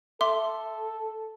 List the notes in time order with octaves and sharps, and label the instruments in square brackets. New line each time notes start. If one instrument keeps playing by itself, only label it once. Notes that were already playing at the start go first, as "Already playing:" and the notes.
[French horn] A4 [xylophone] E5 C6 D6